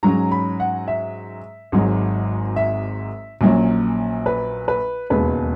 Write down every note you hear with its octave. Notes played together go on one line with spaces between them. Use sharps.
G#2 F#3 C#4 A#5
B5
F#5
E5
G#1 G#2 F#3
E5
A#1 A#2 F#3 C#4
B4
B4
E1 D#2 C#3 G#3 C#4 B4